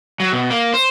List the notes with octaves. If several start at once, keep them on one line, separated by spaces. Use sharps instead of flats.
F#3
B2
A#3
C5